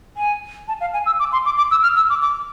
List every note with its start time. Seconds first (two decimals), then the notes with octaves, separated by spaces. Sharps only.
0.17 G#5
0.68 A5
0.81 F5
0.94 G#5
1.06 E6
1.19 D6
1.32 C6
1.45 D6
1.57 D6
1.71 E6
1.83 F6
1.96 E6
2.10 D6
2.22 D6